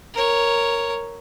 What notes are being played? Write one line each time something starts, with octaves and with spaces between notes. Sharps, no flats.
A#4 C#5